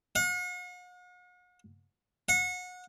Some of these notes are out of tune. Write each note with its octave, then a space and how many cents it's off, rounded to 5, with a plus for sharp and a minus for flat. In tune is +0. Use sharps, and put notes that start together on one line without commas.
F#5 -45
F#5 -30